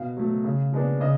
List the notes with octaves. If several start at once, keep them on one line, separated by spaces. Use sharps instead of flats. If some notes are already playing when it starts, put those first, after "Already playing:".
Already playing: B2 F5
F#3 A3
C#3
F3 G#3 B3 D4
C#3 D#5